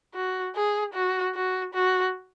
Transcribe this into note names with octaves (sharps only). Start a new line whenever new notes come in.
F#4
G#4
F#4
F#4
F#4